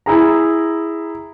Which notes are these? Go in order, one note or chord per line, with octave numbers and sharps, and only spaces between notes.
E4 G#4 A#5